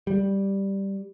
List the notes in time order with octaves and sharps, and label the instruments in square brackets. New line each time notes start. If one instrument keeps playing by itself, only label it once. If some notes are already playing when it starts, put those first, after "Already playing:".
[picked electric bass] G3